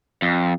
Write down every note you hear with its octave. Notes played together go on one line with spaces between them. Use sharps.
F2